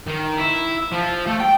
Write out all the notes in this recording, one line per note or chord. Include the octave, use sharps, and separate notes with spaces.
D#3
E4
F3
A3
G5